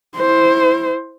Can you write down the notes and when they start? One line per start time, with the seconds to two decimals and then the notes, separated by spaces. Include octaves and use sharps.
0.16 E4 C5